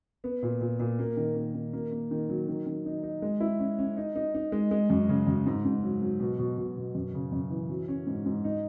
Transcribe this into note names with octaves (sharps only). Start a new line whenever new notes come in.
B3
A#2
A#2
A#2
A#3
D#3
A#3
D#3
A#3
A#3
D#3
F#3
D#3
D#3
D#4
D#4
G#3
E4
C#4
C#4
D#4
D#4
D#4
G#3
G#3
F#2
C#3
F#2
G#2
G#2
F#3
F#3
B2
B2
B2
B2
F#2
C#3
F#2
E3
F#3
C#4
G#2
G#2
D#4